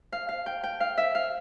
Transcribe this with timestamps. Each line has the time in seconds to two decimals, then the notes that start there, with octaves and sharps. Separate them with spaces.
0.12 F5
0.29 F5
0.46 G5
0.63 G5
0.80 F5
0.98 E5
1.15 F5